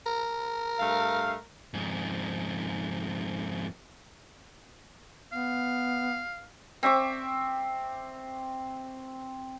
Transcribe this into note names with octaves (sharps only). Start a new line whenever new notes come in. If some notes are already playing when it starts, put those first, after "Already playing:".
A#4
G2 A3 F5
F2 G#2
B3 F5
C4 E5 C#6 D6